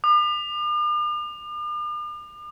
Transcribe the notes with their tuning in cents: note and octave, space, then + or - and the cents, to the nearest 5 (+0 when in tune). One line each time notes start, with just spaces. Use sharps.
D6 +45